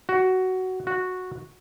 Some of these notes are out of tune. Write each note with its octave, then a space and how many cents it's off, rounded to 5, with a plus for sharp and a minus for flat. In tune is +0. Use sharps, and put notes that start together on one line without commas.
F#4 +10
F#4 -10